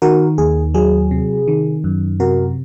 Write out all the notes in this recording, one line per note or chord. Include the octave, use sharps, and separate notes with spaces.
D#3 F#4 A#4
D#2 G#4
F#3 G#4
C3
D#3
F#2
C3 F#4 A#4